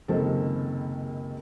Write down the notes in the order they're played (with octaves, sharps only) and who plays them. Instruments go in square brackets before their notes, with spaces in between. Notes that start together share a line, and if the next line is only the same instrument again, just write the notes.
[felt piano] F#1 C#2 C3 D#3 A4 C5